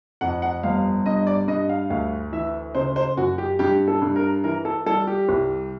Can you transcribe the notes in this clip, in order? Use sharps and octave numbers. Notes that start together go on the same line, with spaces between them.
F2 F#5
F#5
G1 F5
G2 D#5
D5
G2 D#5
F5
D2 F5
E3 E5
C#3 C5
C5
F#2 F#4
G4
G2 G4
A4
G2
A#4
E3 A#4
A4
G3 A4
G4
C2